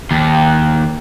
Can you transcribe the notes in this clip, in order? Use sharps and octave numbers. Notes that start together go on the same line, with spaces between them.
D#2